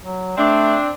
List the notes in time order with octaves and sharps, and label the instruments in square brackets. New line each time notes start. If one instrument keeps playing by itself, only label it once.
[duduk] F#3
[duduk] A3 [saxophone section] C4 D4